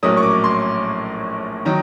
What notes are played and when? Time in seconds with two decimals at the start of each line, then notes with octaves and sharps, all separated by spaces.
0.03 A#1 A2 F#3 A#3 C#4 D#6
0.17 C#6
0.23 D6
0.44 C6
1.65 D#3 F#3 A#5